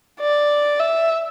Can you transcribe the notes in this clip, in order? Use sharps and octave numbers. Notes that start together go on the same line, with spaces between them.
D5
E5